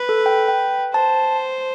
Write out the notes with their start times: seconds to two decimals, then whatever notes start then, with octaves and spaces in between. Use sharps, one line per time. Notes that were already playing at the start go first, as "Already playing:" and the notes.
Already playing: B4
0.09 A4
0.26 G5
0.48 G5
0.94 C5 A5